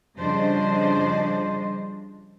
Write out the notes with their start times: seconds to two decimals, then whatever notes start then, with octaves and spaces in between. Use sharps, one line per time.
0.16 C#3 F3 G3 D4 C5 D#5